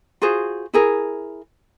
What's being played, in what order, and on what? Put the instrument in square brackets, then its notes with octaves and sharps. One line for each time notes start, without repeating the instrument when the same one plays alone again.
[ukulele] F4 F#4 G#4 C5
E4 G#4 A#4